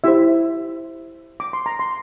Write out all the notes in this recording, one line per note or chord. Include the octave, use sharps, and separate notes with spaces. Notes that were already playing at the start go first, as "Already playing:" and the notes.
E4 G4 C5 E5
D6
C6
A#5
C6